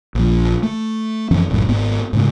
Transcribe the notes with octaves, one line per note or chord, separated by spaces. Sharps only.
A#1 F3
A3
F#2 E3 F3 C#4
F#1 B1 F#2 A2
G#1 G#2 B3
G#2 C#3 A3